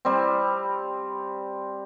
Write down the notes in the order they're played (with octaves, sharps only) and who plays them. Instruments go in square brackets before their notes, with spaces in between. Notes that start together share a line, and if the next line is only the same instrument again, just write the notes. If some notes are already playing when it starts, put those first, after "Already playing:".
[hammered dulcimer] G3 C4